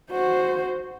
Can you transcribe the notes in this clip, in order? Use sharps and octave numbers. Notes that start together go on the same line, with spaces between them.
F#4 C5